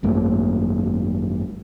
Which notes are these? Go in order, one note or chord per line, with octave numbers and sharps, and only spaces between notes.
G#1 F#2 A3 A#3